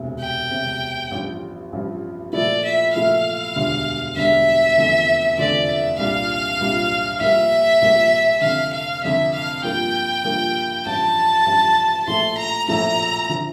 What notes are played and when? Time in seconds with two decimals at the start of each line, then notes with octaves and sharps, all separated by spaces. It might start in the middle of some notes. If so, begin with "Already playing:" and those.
Already playing: E1 D2 C3
0.20 G5
0.51 E1 D2 C3
1.11 A1 G2 F3
1.72 A1 G2 F3
2.33 A#2 F3 A3 E4 D5
2.64 E5
2.94 A#2 F3 A3 E4 F5
3.56 E1 D2 D3 G3 D4
4.16 E1 D2 D3 G3 D4 E5
4.77 F1 E2 D3 F3 A3
5.38 F1 E2 D3 F3 A3 D5
5.68 E5
5.98 C2 A#2 G3 D4 F4 F5
6.60 C2 A#2 G3 D4 F4
7.20 A#1 A2 G3 A#3 F4 E5
7.82 A#1 A2 G3 A#3 F4
8.41 F1 F2 D3 F5
8.73 F5
9.03 F1 F2 D3 E5
9.34 F5
9.63 G2 F3 A#3 F4 G5
10.24 G2 F3 A#3 F4
10.86 A1 G2 F3 A5
11.46 A1 G2 F3
12.07 A#1 A2 F3 A3 E4 C6
12.37 A#5
12.68 A#1 A2 F3 A3 E4 A#5
13.29 D3 F3